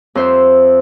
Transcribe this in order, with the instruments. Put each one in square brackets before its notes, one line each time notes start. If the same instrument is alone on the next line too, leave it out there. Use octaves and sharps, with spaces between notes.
[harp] F2 C5 E5